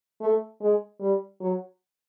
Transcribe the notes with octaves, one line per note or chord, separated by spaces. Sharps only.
A3
G#3
G3
F#3